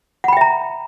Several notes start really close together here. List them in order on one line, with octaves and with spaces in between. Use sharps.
F#5 B5 G5 E5 A#5